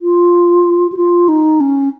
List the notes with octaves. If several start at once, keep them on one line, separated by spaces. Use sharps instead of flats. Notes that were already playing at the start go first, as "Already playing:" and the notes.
F4
F#4
F4
D#4
C#4